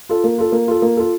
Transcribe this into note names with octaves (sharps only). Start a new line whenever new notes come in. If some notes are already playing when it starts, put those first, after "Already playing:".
F4 A4
A#3
F4 A4
A#3
F4 A4
A#3
F4 A4